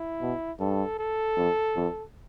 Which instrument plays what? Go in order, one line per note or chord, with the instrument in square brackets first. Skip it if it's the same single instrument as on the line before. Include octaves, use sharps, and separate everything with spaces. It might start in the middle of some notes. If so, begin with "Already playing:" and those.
Already playing: [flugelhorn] E4
[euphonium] B2
[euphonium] G2 [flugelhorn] A4
[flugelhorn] A4
[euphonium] F2
F2